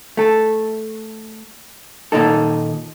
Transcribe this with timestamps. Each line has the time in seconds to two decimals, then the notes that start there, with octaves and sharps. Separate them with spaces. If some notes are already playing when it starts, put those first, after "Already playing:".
0.17 A3 A4
2.12 A#2 D#3 D#4 A4